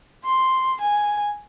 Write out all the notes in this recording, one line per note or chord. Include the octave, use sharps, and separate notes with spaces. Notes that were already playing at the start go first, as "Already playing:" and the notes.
C6
G#5